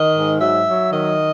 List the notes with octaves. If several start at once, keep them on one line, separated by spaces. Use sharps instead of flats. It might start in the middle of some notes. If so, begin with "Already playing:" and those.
Already playing: D#3 D#5
G#2
F#3 E5
F#3
D#3 D#5